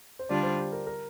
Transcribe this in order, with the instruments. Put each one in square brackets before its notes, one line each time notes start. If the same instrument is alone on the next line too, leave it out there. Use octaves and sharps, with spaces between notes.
[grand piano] C5
[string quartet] D3 G3 D4 F4 [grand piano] D5
[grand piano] C5
G4
A#4
A#4